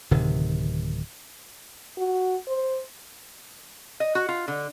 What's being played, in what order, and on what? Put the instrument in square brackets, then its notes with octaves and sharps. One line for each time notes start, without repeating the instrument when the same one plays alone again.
[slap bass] D1 C3 D#3
[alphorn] F#4
C5
[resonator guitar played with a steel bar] D#5
F#4
F4
D3